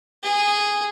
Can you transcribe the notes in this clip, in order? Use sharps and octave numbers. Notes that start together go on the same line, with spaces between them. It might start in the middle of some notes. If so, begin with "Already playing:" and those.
G#4